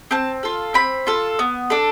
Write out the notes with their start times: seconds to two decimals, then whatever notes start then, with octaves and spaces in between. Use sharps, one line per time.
0.11 C4 A5
0.43 F4 A4
0.74 C4 B5
1.07 F4 A4
1.39 B3
1.70 D4 A4